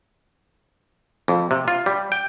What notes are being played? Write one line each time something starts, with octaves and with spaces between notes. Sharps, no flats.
F2
C3
F4
G3
G5